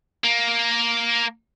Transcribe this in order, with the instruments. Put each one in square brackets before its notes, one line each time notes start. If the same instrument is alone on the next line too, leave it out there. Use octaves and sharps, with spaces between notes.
[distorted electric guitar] A#3